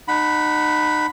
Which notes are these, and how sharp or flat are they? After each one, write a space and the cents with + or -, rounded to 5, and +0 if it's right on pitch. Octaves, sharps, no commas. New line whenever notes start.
D#4 -30 F#5 +0 B5 +0